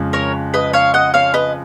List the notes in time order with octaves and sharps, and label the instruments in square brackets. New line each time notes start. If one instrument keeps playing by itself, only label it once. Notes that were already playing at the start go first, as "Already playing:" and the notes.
Already playing: [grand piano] F2 C#3 F3 G#3
[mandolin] A#4 C#5
B4 D#5
C#5 F5
D#5 F#5
C#5 F5
B4 D#5